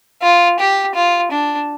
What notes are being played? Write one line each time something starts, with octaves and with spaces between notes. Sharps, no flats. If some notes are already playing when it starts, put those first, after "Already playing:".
F4
G4
F4
D4